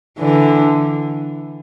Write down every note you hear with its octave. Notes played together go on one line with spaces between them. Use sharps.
D3 E3